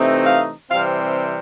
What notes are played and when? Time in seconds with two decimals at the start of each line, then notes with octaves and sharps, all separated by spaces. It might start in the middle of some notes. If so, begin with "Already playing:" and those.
Already playing: C3 E3 A3 C4 D#4
0.24 F5
0.70 C3 E3 G3 C4 F5